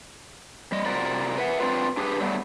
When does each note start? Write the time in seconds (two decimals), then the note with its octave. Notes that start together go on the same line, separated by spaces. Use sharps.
0.72 G3 D#5
0.85 C3 F4 F#4 A#4 D5
1.38 B4 E5 F#5
1.60 C4 D4 F4 B4
1.97 D4 G4 G#4 B4
2.20 F#3 G3 A3 B3